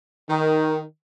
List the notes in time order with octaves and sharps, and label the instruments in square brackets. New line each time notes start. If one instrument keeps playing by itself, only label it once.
[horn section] D#3